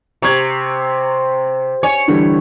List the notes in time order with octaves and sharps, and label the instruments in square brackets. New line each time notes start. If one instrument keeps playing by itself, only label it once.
[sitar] C3 [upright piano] C#6 G#6
[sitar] C#5 [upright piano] G#5
[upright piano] D3 E3 G3